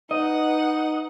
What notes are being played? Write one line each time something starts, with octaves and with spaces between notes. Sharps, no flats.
D#4 B4 D#5 F#5